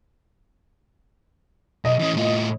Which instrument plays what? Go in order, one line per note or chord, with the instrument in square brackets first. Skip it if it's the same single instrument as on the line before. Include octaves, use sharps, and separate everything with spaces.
[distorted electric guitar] B1 [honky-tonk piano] D#5
[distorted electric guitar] E3 C#4
A2 F4